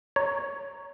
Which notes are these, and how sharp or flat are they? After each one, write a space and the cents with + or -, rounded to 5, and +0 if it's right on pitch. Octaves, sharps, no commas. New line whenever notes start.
C#5 +10 A#5 +0